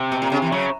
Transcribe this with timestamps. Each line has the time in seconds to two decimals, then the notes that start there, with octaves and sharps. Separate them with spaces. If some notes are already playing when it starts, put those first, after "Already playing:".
Already playing: C3
0.12 B2
0.22 A#2
0.32 C#3
0.42 E3
0.52 C#3 F#3